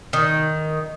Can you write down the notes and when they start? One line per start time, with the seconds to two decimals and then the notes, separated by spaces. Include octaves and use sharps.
0.13 D#3